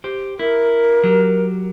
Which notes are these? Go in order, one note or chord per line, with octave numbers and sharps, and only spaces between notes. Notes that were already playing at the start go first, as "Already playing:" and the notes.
G4 C5
E4 A#4
F#3 G4